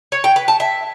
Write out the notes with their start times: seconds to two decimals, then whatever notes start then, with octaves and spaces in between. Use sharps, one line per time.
0.12 C#5
0.24 G5
0.36 B4
0.48 A5
0.60 E5